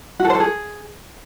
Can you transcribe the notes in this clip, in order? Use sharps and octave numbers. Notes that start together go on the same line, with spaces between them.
F#4
A4
C5
A4
G#4